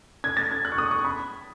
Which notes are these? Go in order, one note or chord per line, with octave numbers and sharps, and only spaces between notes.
G#6
A6
G#6
F#6
C#6
D#6
C#6
B5